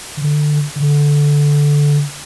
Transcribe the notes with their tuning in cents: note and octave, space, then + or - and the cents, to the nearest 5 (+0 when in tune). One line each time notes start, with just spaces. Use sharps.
D3 +20
D3 -10